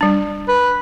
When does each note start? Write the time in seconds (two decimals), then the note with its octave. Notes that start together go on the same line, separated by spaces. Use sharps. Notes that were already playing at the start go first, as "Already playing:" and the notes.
0.01 G3 D4
0.48 B4